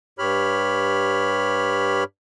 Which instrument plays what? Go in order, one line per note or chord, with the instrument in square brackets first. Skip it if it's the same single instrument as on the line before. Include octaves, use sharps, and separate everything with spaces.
[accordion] G2 G4 C#5 B5 F6